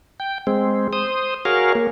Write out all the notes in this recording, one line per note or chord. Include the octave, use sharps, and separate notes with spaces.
G5
G#3 C4
C5 D#6
F#4 G#4 A#4 C#5 F5
A#3